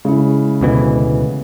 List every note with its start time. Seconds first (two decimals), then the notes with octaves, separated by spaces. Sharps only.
0.05 C#3 G#3 E4
0.61 D2 B2 E3